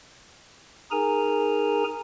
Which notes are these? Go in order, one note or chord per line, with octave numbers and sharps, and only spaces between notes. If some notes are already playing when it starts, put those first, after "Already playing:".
D#4 G#4 A#4 G#5 A#5